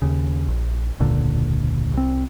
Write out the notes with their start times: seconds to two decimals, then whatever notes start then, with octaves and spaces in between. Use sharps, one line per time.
0.02 D#2 C#3
0.48 A#1
0.99 E1 C#2 A#2 D3
1.93 C2 C4